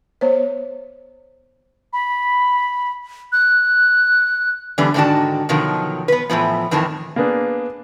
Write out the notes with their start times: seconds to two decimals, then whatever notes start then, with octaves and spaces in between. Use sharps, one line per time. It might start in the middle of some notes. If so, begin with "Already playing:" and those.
0.21 B3 C5 C#5
1.93 B5
3.32 F#6
4.78 D3 E3 G3 B3 D4
4.94 G#2 D3 D#3 D4 F#4 A5
5.49 B2 D3 D#3 F3 F#3
6.08 B3 B4
6.30 A2 E3 F3 B3
6.71 F2 A2 D#3 E3 A5
7.16 A#3 B3 D4 G#4 B4